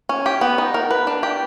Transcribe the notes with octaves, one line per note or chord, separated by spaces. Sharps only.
C#4
G4
B3
D#4
A#4
B4
D4
G4